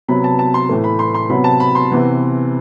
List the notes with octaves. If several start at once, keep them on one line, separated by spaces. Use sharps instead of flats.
C3 F#3 B3 B5
A5
A5
C6
A2 E3 A3
B5
C6
C6
C3 F#3 B3 B5
A5
B5
C6
C3 E3 B3